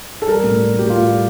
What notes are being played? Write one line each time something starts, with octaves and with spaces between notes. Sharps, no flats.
A4
G3 A#4
A2
G3
A2 G4
A2 F4
G3